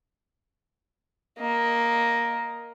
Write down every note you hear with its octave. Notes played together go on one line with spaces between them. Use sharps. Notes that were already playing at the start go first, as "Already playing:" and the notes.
A#3 D#5